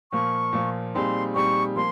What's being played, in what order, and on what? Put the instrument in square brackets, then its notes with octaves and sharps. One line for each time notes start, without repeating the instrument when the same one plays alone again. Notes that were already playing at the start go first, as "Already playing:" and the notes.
[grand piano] A#2 F3 A#3 [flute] C#6
[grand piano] A#2 F3 A#3
[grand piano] A#2 G3 C4 D#4 G#4 [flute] C6
[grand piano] A#2 G3 C4 D#4 G#4 [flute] C#6
[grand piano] F3 A#3 [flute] C6